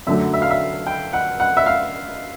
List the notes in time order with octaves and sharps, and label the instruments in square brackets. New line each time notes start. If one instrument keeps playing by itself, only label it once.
[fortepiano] F#2 D3 F#3 A3 E5
E5
F5
E5
G5
F#5
F#5
E5
F5